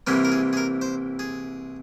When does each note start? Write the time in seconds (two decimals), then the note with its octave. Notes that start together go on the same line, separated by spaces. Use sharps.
0.07 C2 C3 E3 G3 A#3 G#4
0.25 A#4
0.32 G#4
0.53 G#4
0.57 A#4
0.82 C5
1.19 G#4